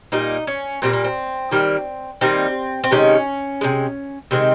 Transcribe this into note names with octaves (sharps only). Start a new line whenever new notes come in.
A#2 G3 A#3 D#4
C#4
A#2 G3 A#3 C4
A#3
C4
D#3 G3 A#3
D#3 G3 A#3 C4
C4
C3 D#3 G#3 C#4
C3 D#3 G#3
C3 D#3 G#3 C4